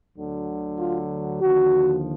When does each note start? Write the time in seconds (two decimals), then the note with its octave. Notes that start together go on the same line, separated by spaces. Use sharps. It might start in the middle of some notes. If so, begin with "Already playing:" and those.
0.16 D2 D3 F#3
0.79 F4
1.41 D#2 D3 F3 F#4